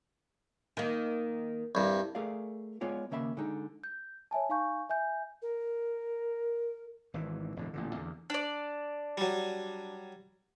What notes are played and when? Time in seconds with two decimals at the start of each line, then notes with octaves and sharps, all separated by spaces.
0.77 D#3 A#3
1.75 C2 G2
2.15 A3 G#4 A#4 D5 F5
2.81 G#3 B3 F4 C#5 D5
3.11 D#2 C#3 A#3 E5 A#5 B5
3.37 D3 G#3 D#4
3.84 G6
4.31 C#5 E5 G#5 A5
4.49 D#4 F5 G#5 C#6 G6
4.89 E5 G#5 G6
5.42 A#4
7.14 G#1 G#2 E3
7.56 E1 A2 D3
7.73 A1 A#2 D3
7.95 E2 D3
8.30 D4 D5
9.17 F#3 G3